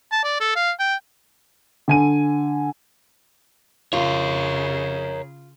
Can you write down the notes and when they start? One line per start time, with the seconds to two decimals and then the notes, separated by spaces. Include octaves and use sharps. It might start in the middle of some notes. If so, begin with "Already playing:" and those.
0.12 A5
0.24 D5
0.40 A4
0.56 F5
0.79 G5
1.88 D3 G#5 D#7
3.93 C#3 F4 G#4 A#4 C#5